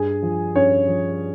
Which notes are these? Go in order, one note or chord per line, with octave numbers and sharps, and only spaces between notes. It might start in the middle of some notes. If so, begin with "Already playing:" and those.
Already playing: G2 G#4 G#5
F3
G2 C#4 C#5
F3